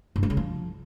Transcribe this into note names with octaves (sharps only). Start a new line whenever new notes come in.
G2
G3
C#3
F3